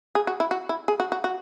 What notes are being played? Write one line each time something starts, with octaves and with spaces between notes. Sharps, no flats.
G#4
F#4
E4
F#4
E4
G#4
F#4
F#4
F#4